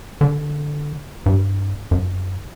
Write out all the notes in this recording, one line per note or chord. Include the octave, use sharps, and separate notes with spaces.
D3
G2
F#2